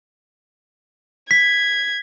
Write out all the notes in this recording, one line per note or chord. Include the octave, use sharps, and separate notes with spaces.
G#6 B6